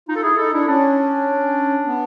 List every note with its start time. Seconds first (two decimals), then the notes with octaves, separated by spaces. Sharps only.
0.09 D#4 F4
0.16 A4
0.23 E4 G#4
0.38 D#4 A4
0.53 D4 E4
0.67 C#4 D4
1.86 B3